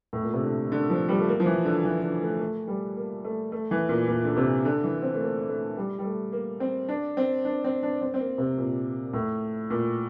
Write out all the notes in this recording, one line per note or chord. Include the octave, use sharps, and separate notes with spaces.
A2
A#2
C3
D3
D3
F3
G3
A3
A#3
F3
E3
D3
E3
D3
A3
A3
G3
A#3
A3
A3
E3
A#2
A#2
D3
C3
D3
E3
C4
A3
A#3
A3
G3
G3
A3
A#3
C4
D4
C4
D4
C4
D4
C4
C4
A#3
C3
A#2
A2
A#2